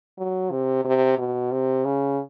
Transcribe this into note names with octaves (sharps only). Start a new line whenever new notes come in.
F#3
C3
C3
B2
C3
C#3